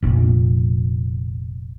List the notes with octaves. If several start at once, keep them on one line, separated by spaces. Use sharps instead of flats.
F1 A#1